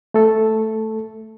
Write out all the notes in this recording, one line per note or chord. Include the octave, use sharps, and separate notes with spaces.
A3 A4